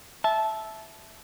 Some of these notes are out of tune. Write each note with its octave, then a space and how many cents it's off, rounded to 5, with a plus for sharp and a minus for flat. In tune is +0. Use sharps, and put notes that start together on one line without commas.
E5 +0 A5 -15